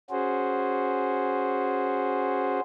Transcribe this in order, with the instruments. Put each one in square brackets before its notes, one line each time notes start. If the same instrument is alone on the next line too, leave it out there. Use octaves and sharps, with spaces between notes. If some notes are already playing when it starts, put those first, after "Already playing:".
[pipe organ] C#4 F#4 G#4 C5